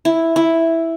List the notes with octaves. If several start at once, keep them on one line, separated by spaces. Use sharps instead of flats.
E4
E4